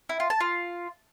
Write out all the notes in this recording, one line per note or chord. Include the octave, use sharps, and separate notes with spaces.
E4
F4
A5
F4